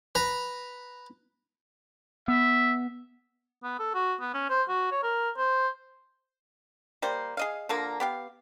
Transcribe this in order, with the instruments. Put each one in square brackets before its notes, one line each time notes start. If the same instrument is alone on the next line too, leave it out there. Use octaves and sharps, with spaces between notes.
[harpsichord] B4 A#5
[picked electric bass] B3 [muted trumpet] E5
[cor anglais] B3
A4
F#4
B3
C#4
C5
F#4
C#5
A#4
C5
[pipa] G3 A#3 C5
G#4 D#5 F5
D3 F3 A#3 A#4
B3 G4 F5